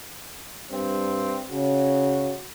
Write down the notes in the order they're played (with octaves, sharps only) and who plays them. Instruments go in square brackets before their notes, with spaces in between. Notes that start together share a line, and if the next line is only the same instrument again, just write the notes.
[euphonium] G2 [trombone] C4
[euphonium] C#3 [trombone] F#4